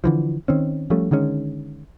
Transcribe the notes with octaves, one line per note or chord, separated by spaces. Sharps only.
D3 E3 F3
D#3 C4 C#4
F3 G3 A3 C#4
D3 D#3 G#3 C#4